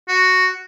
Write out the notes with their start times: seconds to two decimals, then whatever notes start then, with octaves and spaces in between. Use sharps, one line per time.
0.08 F#4